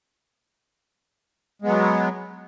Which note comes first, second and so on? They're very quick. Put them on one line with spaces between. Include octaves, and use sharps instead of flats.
G#3 B3 F#3